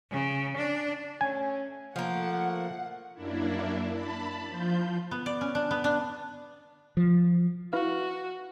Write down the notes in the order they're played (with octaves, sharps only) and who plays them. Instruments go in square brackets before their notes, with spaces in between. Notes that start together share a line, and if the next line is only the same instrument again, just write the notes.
[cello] C#3
D4
[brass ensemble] A3 C#4 [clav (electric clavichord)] G#5
[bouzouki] F3 A#3 [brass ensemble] A3 [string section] F#5
[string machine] F#2 A#3 D4 E4
A5 B5
F3 F4 G6
[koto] B3
D5
C#4
D4
B3
D4
[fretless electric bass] F3
[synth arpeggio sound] E4 B4 F5 [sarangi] F#4